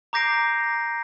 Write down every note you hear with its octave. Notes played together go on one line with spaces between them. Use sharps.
A#5 D6 G6 A#6 C7 D7